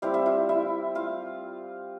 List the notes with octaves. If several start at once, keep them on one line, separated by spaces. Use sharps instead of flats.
G3 C4 E4 F5
E5
F4 F5
E4 E5
F4 F5